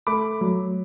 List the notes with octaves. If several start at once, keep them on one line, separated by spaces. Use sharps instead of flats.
A3 B5 D6
F#3